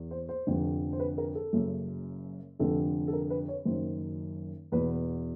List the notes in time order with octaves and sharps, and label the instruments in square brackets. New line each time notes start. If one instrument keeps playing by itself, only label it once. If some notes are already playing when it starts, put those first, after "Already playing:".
Already playing: [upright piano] E2
C5
C5
F1 F2 D3
C5
B4
A#4
A4
F#1 F#2 C#3
F1 F2 D3 A4
A4
A#4
B4
C#5
F#1 F#2 D#3 C5
E2 B2 B4